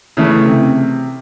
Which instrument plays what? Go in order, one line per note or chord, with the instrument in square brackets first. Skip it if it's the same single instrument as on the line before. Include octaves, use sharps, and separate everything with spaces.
[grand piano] C#3 E3 A3
C3